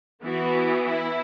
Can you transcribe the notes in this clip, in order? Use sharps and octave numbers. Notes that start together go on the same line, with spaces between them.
E3 B3 F#4
E4